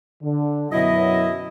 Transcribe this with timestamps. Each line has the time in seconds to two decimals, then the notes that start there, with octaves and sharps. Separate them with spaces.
0.23 D3
0.72 F#2 B2 F#3 E4 D#5